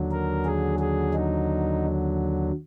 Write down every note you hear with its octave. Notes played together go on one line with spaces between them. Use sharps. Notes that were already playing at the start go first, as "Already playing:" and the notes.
Already playing: D#2 D3 F#3
A#4
G#4
G#4
D#4